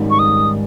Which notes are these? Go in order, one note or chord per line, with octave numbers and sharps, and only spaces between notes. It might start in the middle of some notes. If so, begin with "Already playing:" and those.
Already playing: G#2 D#3 G3 C#4
C#6
D#6